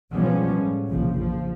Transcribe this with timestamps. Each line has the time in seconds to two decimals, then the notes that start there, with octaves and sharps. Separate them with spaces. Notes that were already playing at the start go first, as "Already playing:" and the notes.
0.13 B2 F3 G3 G#3 B3 C#4
0.52 A2
0.88 F1 A#1 C#3 F3
1.20 F3